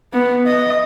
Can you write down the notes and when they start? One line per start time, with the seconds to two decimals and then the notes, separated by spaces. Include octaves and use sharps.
0.13 B3
0.47 D#5